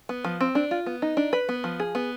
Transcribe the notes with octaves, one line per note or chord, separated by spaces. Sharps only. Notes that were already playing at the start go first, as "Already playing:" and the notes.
B3
F3
C4
D4
F4
B3
D#4
D4
B4
B3
F3
G#4
B3